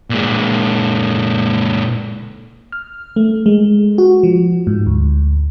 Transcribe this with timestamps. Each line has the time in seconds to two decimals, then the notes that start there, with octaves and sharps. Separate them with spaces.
0.10 A#2 G#3
2.72 F6
3.16 A3
3.46 G#3
3.98 F#4
4.23 F3
4.67 G#2
4.86 D2